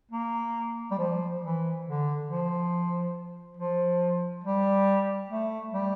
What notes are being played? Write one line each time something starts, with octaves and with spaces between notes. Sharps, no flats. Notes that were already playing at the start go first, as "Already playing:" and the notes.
A#3
G3
F3
E3
D3
F3
F3
G3
A3
G3